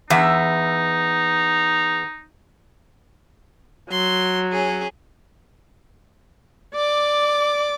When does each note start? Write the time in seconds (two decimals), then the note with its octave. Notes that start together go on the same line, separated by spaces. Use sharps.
0.10 E2 D#4 E5
3.91 F#3 C6
4.52 C#4 G#4
6.75 D5 D6